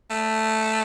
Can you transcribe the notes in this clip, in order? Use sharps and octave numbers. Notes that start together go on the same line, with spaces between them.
A3